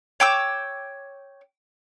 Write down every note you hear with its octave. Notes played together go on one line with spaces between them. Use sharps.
C#5 G5 D6 E6